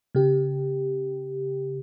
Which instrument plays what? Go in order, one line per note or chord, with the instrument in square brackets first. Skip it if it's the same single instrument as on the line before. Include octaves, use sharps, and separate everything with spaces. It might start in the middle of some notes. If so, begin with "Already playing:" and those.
[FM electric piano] C#3 G4